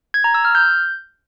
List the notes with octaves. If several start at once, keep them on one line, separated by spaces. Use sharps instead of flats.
G#6
A#5
E6
F6
G6